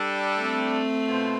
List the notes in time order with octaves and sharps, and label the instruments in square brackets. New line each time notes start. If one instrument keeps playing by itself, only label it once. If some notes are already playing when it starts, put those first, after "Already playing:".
Already playing: [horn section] G3 D4 A4
[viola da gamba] A3 C4
[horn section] B2 B3 F4 C5